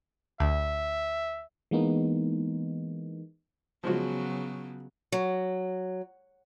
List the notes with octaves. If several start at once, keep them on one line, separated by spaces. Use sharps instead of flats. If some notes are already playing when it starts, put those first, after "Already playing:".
D2 E5
E3 G#3 A#3 B3 D#4
C#3 F3 F#3 G#3 B3 F#4
F#3